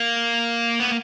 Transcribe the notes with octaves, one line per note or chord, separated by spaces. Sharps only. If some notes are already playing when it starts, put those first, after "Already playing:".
Already playing: A#3
B3